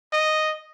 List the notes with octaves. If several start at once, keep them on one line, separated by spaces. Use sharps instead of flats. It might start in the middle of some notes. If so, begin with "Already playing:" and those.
D#5